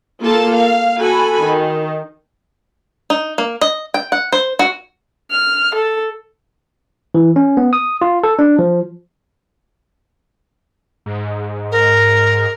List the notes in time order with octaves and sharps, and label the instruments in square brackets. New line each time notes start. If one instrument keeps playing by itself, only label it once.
[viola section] A#3 F4 A4 A#4 A5
F5
F#4 A4 G#5 B5
D#3
[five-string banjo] D#4
A#3
D#5
G5
F#5
C5
F#4
[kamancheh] F6
A4
[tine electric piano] E3
C#4
B3
D#6
F4
A4
D4
F3
[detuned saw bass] G#2
[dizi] A#4